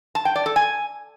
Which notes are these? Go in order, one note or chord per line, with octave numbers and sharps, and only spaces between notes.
A5
G5
D5
A4
G#5